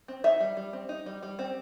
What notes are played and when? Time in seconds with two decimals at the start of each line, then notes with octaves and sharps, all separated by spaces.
0.08 C4
0.24 D#4 E5
0.40 G3
0.57 G3
0.73 C4
0.89 D#4
1.06 G3
1.23 G3
1.39 C4